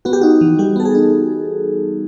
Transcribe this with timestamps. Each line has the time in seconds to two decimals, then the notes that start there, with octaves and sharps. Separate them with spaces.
0.05 B3 F#4
0.13 G4
0.21 D#4 F#4
0.41 E3
0.59 G3 G4
0.76 B3 A4
0.85 G#4
0.95 D#4